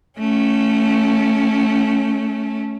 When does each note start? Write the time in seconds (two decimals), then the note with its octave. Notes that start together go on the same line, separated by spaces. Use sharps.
0.19 A3 C#4